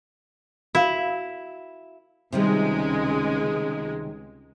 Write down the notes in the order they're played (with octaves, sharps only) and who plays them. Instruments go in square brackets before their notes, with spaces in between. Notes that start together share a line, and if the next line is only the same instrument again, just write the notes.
[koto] E4 [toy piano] F#4 A#4 F5
[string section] C#2 G#3 [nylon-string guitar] C3 D#3 G3